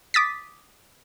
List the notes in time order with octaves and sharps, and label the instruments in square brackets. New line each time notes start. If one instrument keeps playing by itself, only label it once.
[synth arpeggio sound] D6 D#6 A6 B6